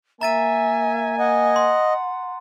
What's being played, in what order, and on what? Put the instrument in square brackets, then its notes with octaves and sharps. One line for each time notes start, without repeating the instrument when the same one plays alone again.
[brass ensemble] A#3 G#5 [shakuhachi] E5 [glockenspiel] A#5 A6 D#7
[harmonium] D#5 [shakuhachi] F#5
[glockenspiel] C6